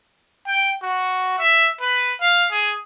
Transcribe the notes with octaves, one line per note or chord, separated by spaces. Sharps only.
G5
F#4
E5
B4
F5
G#4